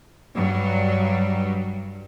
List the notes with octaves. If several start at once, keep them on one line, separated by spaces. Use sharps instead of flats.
G2 F#3 G3